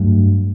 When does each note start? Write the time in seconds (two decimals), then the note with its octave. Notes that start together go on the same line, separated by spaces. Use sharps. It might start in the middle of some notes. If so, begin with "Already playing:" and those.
Already playing: G2 F#3 A3